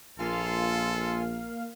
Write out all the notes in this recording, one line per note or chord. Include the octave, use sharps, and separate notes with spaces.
A#1 A#3 F4 A4 F5 G#5 C6